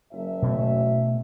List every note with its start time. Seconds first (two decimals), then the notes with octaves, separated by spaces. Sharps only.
0.12 F#1 E5
0.42 B2 A3